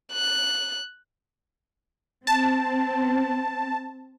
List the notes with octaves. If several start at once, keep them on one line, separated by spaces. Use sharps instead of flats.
F#6
C4 A5